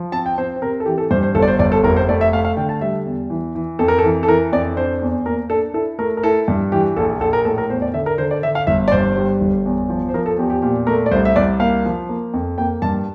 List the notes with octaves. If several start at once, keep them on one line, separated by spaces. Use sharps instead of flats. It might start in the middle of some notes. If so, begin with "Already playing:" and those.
Already playing: F3
C4 A5
G5
C4 C5
C5
C3 A#4
A4
E3 G4
A4
G2 C5
C5
G1 A4
D5
C5
G1 D5
A4
F1 A#4
C5
A3 D5
E5
A3 F5
F5
D3 G5
A5
G3 E5
E2
E3
E3
F2 A4
A#4
A4
E3
A4
E3 A#4
F2 D5
D4 C5
E2
A#3 A#4
D4 A4
E4 A4
A3 A#4
A#4
E4 A4
G2
E3 G4
A#1 A4
A#1 A4
A#4
A2 A4
A#4
E2 C5
D5
D3 E5
A#4
D3 C5
D5
D3 E5
F5
G1 E5
D5
G2 C5
G3
G1
E2
F3
C5
F3 A#4
A4
E2 G4
G4
A#2 G4
A3 A#4
D5
C2 C5
E5
C2 D5
A#3 F5
F3
A#3
F2
A#3 G5
G2 A5